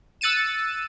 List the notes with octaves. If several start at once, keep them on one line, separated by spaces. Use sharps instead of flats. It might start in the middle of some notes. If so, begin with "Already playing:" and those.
E6 F#6 A6 C#7 D#7 E7